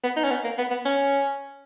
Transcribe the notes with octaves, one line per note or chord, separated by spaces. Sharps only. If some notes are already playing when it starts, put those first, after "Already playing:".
B3
D#4
C#4
B3
A#3
B3
B3
C#4